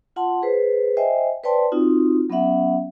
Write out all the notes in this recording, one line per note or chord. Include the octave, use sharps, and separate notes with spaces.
F4 F#5 A5 C6
G#4 B4 C5
C5 D#5 E5 G5 G#5
B4 C5 D5 G5 A5 C6
C4 D#4 F4 F#4
F#3 B3 C#4 E5 F#5